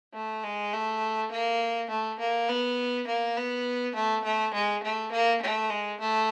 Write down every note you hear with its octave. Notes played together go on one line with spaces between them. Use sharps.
A3
G#3
A3
A#3
A3
A#3
B3
A#3
B3
A3
A3
G#3
A3
A#3
A3
G#3
A3